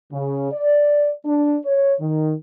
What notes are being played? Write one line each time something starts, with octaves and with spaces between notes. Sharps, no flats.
C#3
D5
D4
C#5
D#3